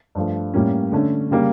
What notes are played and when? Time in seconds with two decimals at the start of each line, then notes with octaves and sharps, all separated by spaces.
0.15 G2 F3 A3
0.54 A2 G3 A#3 C#4
0.92 D3 A3 C#4
1.31 C#3 G3 A#3